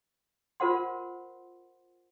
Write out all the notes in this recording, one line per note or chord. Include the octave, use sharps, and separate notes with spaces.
F4 A#4 C5 F#5 C6